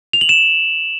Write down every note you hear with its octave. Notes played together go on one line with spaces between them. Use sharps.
F7
F#7
E7